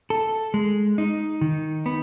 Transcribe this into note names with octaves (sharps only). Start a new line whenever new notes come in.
A4
G#3
D#4
D#3
B3